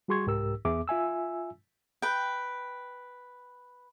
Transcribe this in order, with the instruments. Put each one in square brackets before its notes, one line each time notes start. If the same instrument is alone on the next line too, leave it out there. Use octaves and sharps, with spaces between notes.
[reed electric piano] G3 F#4 G#4 C6 C#6 G#6
C2 G#2 G4 A#4 E6
E2 B3 G#4 E5 D6
F4 E5 G#5 E6
[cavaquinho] B4 G5